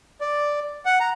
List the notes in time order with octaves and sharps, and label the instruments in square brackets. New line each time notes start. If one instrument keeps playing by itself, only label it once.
[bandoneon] D5
F#5
A#5